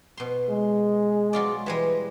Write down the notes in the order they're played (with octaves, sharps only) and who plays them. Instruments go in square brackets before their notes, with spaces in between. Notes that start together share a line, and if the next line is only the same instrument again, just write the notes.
[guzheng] B2 C6
[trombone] G#3
[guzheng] F#3 F4 D5
E3 G3 G#3